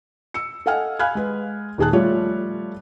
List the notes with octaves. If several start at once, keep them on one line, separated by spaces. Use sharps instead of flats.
E6 C#7
A4 D#5 F5 F#5 G#5 F6
F5 G#5 B5 F6 F#6 G#6
G#3 B4
D#1 D#3 G#4 A5 F#6
F3 G3 A3 F4 C#5